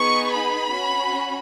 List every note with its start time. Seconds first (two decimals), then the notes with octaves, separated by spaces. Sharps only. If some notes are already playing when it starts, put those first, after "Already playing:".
Already playing: B3 D#4 G#4 C#6
0.31 B5
0.73 C#4 F#4